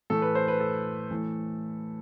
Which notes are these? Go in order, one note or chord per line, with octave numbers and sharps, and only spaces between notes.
A2 E3 A3 A4
B4
C5
B4
A4
A2 E3 A3